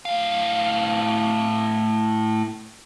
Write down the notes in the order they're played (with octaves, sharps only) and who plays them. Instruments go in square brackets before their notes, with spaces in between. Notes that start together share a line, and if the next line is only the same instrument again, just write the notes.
[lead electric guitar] A2 F5